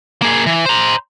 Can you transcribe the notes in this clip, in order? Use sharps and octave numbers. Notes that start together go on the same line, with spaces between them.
A#3 G#4
E3
C5 A#5